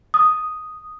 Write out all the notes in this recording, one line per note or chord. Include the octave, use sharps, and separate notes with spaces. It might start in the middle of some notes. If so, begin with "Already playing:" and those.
D#6